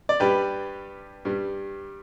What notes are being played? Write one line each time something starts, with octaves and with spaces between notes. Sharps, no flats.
D5
G2 G3 G4 B4
G2 G3